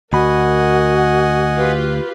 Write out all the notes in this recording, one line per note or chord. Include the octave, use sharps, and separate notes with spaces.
D2 F#4 A#4 D#5 F#5 G#5 B5
F4 G4 B4